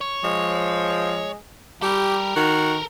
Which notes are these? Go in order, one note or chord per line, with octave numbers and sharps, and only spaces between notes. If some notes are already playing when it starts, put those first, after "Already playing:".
C#5
F3 G#3
G3 G4 A4 A#4
D#3 F#4